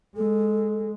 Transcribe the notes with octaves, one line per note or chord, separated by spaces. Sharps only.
G#3 A4